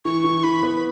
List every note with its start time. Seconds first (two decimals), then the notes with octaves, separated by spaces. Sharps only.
0.05 E3 C#6
0.24 E3
0.44 E3 B5
0.63 B3